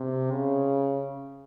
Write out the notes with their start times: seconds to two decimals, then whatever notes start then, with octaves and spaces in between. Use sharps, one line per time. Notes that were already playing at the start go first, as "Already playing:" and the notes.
Already playing: C3
0.31 C#3